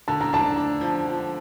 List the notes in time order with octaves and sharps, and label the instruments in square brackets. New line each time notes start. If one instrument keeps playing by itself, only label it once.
[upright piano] D3 [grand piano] A5
[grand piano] A#5
[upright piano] D4 [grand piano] A5
[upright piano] D4
F3
F3